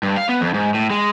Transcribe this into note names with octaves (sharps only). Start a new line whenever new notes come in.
G2
F5
B3
F2
G#2
A2
G#3